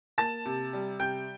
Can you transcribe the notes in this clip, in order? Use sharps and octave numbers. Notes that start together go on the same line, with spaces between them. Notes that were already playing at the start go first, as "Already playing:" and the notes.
A#3 A5 A6
C3
G3
C3 G5 G6